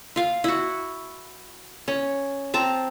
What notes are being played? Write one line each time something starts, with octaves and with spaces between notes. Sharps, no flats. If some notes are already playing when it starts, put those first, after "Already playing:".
F4 F5
E4 F#4
C#4
C4 A5 A#5